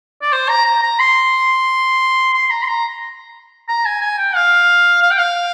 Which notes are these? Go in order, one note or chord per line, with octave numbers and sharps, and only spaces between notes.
D5
C5
A#5
A#5
A#5
C6
C6
A#5
C6
A#5
A#5
G#5
G#5
G5
F5
F5
G5
F5